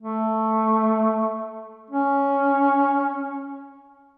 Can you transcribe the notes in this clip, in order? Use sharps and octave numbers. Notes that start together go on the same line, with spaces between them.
A3
C#4